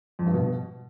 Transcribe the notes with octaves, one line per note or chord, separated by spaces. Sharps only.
F2
G2
B2